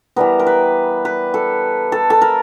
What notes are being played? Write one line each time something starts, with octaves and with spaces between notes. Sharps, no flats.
E3 G3 B3 A#4
A#4
B4
B4
A4
A4
A4
A#4